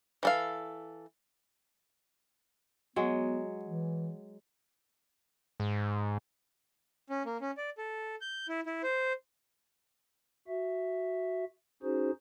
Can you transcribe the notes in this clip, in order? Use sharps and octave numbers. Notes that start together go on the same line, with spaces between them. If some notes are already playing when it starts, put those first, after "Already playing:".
E3 A4 F5
F#3 G#3 B3
E3
G#2
C#4
A#3
C#4
D5
A4
G6
E4
E4
C5
F#4 E5
C#4 D#4 F#4 G#4 C5